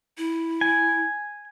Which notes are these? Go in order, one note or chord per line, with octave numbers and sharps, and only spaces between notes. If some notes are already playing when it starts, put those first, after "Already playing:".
E4
G#5